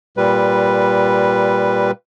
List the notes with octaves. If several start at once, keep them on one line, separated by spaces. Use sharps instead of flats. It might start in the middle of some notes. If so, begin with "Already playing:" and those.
A#2 G3 B4